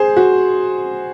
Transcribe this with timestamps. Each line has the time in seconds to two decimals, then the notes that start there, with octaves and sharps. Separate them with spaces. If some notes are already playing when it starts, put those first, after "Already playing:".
Already playing: G#4 C5
0.17 F#4